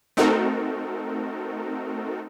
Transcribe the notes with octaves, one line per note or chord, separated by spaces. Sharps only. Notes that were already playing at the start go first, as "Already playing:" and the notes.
A3 C4 D#4 F#4 A4 A#4